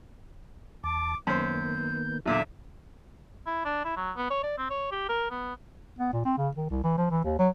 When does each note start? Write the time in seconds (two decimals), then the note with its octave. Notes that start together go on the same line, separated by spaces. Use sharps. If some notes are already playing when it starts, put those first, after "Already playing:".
0.84 E2 A5 D6
1.27 F#2 D#3 A#3 B3 C5 G6
2.26 E2 A#2 D3 F#3 E5
3.46 E4
3.65 D4
3.85 E4
3.97 F#3
4.16 B3
4.30 C#5
4.43 D5
4.58 C4
4.70 C#5
4.91 G4
5.09 A#4
5.31 B3
5.99 B3
6.13 A#2
6.25 C4
6.37 C#3
6.57 D#3
6.70 C2
6.84 E3
6.98 F3
7.11 E3
7.24 D#2
7.39 F#3